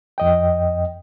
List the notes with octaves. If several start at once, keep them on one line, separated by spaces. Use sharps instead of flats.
F2 D#5 G5